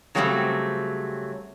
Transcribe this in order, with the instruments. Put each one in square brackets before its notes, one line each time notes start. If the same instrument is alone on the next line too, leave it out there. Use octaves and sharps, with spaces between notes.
[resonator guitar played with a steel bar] C#3 F#3 G3 A3 B3 C4